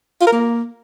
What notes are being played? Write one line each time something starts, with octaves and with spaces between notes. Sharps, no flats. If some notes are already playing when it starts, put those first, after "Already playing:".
F4
A#4
A#3